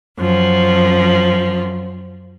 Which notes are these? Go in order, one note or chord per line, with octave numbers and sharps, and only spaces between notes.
F#2 F3